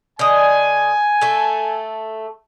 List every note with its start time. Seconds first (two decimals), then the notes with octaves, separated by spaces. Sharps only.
0.19 D3 D#5 G#5
1.21 A3 A4